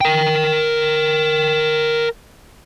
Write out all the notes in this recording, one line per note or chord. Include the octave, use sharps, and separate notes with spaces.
A#4 G5